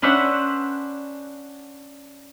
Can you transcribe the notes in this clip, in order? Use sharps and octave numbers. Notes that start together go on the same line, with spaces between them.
C#4 D4 B4 C5 E5 F#5